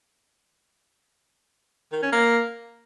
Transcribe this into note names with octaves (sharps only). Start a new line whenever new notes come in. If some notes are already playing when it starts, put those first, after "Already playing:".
D#3
C#4
A#3